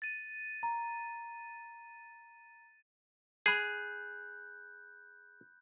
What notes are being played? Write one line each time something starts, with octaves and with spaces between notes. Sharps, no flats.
A6 D#7
A#5
G#4 B5 F#6 G6